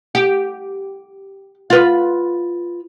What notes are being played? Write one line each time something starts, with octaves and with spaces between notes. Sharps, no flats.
G4
F4 B4